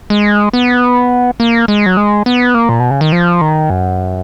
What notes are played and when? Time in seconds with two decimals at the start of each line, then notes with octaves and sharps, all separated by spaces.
0.10 G#3
0.53 B3
1.40 A#3
1.68 G#3
1.86 F#3
1.97 G#3
2.26 B3
2.54 A#3
2.69 A#2
2.80 B2
2.91 C#3
3.01 D#3
3.12 F3
3.41 D#3
3.70 F#2